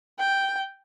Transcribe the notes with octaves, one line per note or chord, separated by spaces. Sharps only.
G5